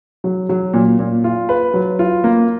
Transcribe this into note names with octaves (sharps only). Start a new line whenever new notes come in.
F#3
F#3
A#2
A#2
F4
B4
F#3
F4
A#3